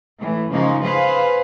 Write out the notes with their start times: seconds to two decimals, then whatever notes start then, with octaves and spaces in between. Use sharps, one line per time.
0.17 A2 E3
0.50 C#3 F3 G#3 A#3 D#4
0.82 G#4 B4 C5 F5